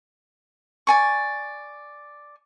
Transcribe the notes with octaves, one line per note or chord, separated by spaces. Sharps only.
D5 G#5 C#6